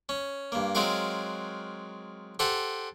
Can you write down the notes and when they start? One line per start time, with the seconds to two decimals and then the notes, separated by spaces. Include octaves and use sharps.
0.09 C#4
0.52 G2 A#3
0.75 F#3 G#3 C4 F#4 A#4 F5
2.39 G4 A4 C5 F#5 G#5